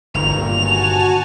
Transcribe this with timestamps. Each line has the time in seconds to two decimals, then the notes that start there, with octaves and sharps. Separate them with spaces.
0.14 G1 A#2 D#3 F7
0.52 F#4 G#5 A5